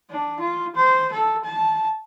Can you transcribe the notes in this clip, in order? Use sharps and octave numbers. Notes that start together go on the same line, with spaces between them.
D4
F4
C5
A4
A5